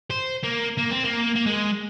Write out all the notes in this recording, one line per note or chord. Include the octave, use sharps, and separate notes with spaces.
C5
A#3
A#3
C4
A#3
A#3
G#3